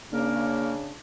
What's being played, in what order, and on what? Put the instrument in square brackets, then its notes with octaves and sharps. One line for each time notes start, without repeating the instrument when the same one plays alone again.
[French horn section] C#3 D4 [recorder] A#3